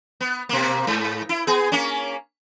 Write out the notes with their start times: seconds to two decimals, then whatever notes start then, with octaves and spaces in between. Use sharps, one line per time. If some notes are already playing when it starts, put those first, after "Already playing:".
0.21 B3
0.49 B2 A#3
0.87 G#2
1.29 E4
1.47 B3 G#4
1.72 A#3 C#4